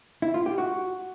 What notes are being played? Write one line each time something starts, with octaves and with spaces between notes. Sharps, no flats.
E4
F4
G4
F#4